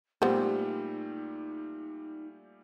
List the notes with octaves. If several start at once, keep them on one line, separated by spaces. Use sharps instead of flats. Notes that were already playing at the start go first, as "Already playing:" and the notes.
A#2 G3 A3 B3 D#4 G4 C5